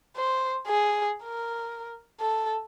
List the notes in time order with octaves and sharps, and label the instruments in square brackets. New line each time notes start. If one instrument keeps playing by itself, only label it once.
[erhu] C5
G#4
A#4
A4